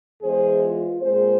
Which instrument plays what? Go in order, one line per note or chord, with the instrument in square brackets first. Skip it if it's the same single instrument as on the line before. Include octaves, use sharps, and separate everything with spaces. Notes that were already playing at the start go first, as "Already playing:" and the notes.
[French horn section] E2 E3 G#3 G#4 C5
F4
A#2 G#3 C4 G#4 C5